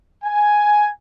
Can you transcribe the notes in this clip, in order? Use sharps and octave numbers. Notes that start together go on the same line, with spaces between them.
G#5